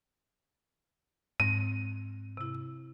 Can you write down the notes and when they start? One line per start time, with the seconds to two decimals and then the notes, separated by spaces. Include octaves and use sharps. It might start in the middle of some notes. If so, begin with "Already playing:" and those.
1.40 G#2 C4 A#6 D#7
2.37 C3 E4